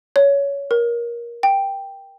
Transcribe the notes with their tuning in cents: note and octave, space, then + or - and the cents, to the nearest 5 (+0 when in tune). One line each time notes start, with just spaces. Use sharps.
C#5 +15
A#4 +20
G5 +5